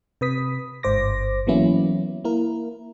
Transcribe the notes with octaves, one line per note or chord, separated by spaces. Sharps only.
C3 B4 D#6 B6
G1 G#2 C5 D6 A#6
E3 F#3 A#3 B3 C#4 E4
A#3 E4 A#4